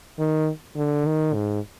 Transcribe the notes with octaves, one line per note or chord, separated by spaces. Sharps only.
D#3
D3
D#3
G#2